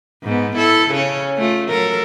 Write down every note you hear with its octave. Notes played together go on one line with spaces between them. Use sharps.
G#2 B3
E4 A4
C#3 C#4
A3 F4
F#3 A4 A#4